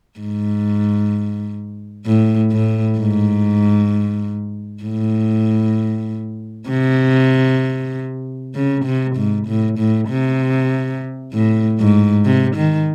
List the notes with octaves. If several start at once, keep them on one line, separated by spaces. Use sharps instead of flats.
G#2
A2
A2
G#2
A2
C3
C#3
C3
G#2
A2
A2
C3
A2
G#2
C3
D#3